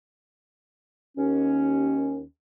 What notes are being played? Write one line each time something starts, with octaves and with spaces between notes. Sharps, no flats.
D#2 C#4